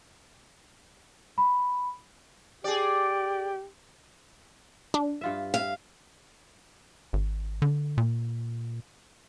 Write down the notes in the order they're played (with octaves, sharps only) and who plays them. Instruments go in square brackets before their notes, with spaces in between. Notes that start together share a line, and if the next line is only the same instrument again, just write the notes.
[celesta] B5
[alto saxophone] G4 [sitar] G#4 D5
[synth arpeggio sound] D4
[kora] G2 F4 E5
[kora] E5 [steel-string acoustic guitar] F5
[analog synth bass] G#1
D3
A#2